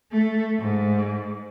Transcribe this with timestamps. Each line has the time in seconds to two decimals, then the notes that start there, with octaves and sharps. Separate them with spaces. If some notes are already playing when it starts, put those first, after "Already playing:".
0.12 A3
0.60 G#2